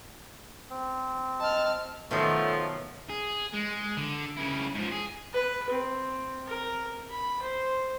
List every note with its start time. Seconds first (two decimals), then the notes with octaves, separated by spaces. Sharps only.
0.70 C4
1.40 D#5 A5 F6
2.11 B2 D#3 F3 F#3 A3
3.10 G#4
3.53 G#3
3.97 D3
4.37 C#3 E4
4.74 G#2 F3
4.91 G#4
5.34 B4
5.70 C4
6.47 A#4
7.10 B5
7.42 C5